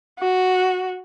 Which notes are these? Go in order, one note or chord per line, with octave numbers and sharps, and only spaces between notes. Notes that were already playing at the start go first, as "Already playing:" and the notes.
F#4